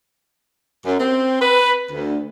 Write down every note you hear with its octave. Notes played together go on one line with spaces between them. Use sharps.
F#2
C4
B4
D2